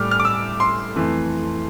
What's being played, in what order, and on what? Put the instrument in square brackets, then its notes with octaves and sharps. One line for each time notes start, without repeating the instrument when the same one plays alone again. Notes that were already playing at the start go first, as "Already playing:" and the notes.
Already playing: [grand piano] A2 G3 D6 F6
F6
D6
E6
C6
F2 E3 A3